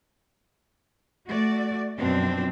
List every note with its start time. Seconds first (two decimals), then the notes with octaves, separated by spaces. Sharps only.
1.30 A3 F#4 D5
1.97 F#2 B2 F3 C4 D4